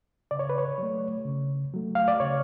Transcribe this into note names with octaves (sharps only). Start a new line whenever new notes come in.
C#3 D5
C#5
B4
C#5
F#3 A3
C#3
F#3 A3
F5
D5
C#3 C#5